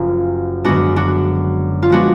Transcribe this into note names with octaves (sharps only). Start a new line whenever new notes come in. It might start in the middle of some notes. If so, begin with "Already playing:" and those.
Already playing: F#1 F#2 F3 F4
F#2 D3 G#3 B3 D4 F#4
D4 F#4
F4
F3 G#3 B3 D4 F#4